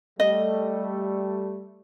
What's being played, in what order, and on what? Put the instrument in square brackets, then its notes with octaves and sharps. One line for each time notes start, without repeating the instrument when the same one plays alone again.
[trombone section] G3 A3 [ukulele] D#5